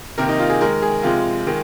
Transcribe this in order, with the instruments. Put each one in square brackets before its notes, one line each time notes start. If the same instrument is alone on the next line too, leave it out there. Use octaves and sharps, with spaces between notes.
[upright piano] C3 D#3 A#3 A#4
D#4
F4
G#4
D#3 G#3 A#4
G#4
C3 F3 G#3 F4
D#3 G#3